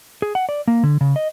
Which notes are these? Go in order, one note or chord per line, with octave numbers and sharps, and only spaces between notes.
G#4
F#5
D5
A#3
D3
C#3
D#5